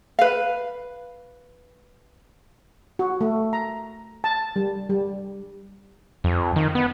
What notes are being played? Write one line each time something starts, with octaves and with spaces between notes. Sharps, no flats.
B4 F5
F#4
A3
A#5
A5
G3
G3
F2
D#3
B3